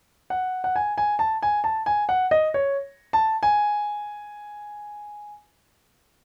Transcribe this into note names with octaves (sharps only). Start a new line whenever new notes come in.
F#5
F#5
G#5
G#5
A5
G#5
A5
G#5
F#5
D#5
C#5
A5
G#5